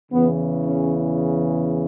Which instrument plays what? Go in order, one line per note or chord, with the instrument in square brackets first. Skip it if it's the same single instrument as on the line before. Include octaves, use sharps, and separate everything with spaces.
[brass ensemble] E2 C#3 E3 B3
C#4